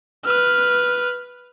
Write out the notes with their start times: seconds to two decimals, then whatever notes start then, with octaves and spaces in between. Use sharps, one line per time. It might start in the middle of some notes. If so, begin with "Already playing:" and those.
0.25 B4 F6